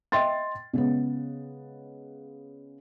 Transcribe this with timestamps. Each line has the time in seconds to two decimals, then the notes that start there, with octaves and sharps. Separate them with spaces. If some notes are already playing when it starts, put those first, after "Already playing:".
0.12 D#5 E5 G5 C6 A6
0.73 C#3 G#3 B3